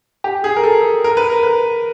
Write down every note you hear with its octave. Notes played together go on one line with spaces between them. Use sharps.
G4
G#4
A#4
A4
A#4
B4
A#4
B4